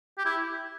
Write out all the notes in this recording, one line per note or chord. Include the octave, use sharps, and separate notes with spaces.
G4
E4